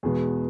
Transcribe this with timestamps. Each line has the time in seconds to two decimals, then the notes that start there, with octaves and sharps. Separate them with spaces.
0.03 E2 B2 G#3 G#4